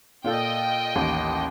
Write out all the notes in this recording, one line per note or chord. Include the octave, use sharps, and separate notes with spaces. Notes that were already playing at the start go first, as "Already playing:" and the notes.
A#2 F4 A4 D#5 G5
A1 D#2